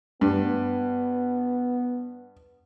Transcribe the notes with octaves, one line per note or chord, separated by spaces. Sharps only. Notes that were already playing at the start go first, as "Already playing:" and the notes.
G2 B3